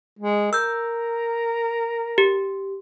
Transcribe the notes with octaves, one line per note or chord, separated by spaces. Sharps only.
G#3
A#4 E6 G6
G4